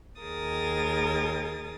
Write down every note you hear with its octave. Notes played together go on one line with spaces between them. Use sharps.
D#2 G#4 A#4 D#6 A6